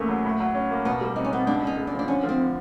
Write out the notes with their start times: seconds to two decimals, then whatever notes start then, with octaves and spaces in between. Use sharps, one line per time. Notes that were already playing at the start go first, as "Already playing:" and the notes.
Already playing: E2 C#3 A3 A#3
0.09 F#3
0.25 A2
0.40 F#3
0.55 C#4
0.71 A#3
0.85 B2 B3
1.01 G3
1.16 C4 D#4
1.25 C#4
1.32 B3 C4
1.47 C#2 D4
1.62 C#3 D#4
1.77 G#3
1.87 D4
1.93 F3
1.99 D4
2.07 D3 C#4
2.24 F3
2.29 C4
2.38 D3